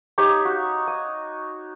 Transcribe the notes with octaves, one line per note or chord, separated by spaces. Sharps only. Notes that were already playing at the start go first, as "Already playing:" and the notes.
D#4 G4 C#5
F#4
D#6